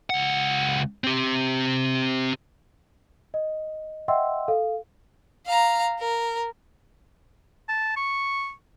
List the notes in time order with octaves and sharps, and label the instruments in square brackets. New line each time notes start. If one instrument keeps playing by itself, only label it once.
[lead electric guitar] C#2 F#5
C4 G4
[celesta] D#5
D#5 E5 F#5 G5 C6 E6
A4 F5
[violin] F5 A#5
A#4
[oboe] A5
C#6